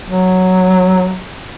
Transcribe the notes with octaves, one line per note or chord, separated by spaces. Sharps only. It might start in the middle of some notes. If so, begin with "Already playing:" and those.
F#3